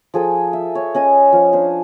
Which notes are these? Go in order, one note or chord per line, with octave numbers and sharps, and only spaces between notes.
F3 G#4 A4 G5
E5
C#5
C#4 D#5 G#5
F3 F5
D4 C5